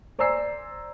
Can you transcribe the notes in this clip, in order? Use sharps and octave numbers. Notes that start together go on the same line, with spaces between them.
C5 D5 G#5 A#5 E6 C7